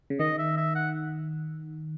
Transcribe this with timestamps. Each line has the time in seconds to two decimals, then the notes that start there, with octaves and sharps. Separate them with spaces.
0.10 C#3
0.20 D#3 D#5
0.38 E5
0.57 E5
0.75 F#5